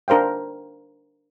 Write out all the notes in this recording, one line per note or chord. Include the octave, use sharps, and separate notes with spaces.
D4 A#4 C5 F5 G5